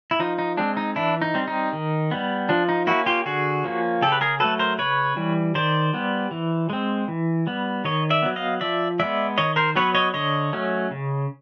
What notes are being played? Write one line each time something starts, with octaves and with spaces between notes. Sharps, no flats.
E4
F3 D#4
D#4
G#3 C4 D4
D#4
E3 D4 E4
D#4
G3 C4
D#4
D#3
G3 B3
F3 D4
D#4
A#3 C#4 E4 F#4
F4 G4
D3 F#4 G#4
F3 A#3 C#4
C#3 G4 A4
B4
G#4 A#4
F#3 A3 A4 B4
A#4 C5
C#3 B4 C#5
E3 G3
D#3 C5 D5
G3 B3
E3
G#3 C4
E3
G3 B3
D#3 C#5 D#5
D5 E5
F#3 B3
D#5 F5
F3 D5 E5
G#3 B3 D5 E5
D#3 C#5 D#5
A#4 C5
F#3 B3 B4 C#5
C#5 D#5
D3 C#5 D#5
F#3 A3 C#4
C#3